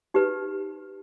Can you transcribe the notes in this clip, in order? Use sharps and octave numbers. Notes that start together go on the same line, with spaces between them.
D#4 G4 B4